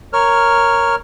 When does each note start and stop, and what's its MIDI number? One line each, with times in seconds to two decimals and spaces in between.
0.13 0.95 70
0.13 0.95 73
0.13 0.95 89